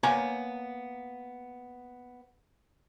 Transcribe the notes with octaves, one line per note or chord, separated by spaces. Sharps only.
A#3 B3 C#5 G#5 A#5